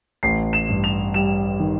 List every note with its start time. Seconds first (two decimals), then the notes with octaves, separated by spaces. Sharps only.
0.23 A1 C7
0.53 E7
0.69 G2
0.84 F7
1.14 G3 E7
1.60 D#3